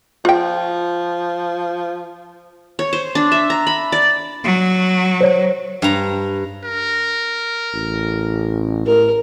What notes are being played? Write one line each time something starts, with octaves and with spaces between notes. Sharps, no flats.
F3 F4 G5
C#5
C5
D4
E5
A#5
B5
D5
F#3
C5 C#5
G2 A#5
A#4
A1
A2 A#4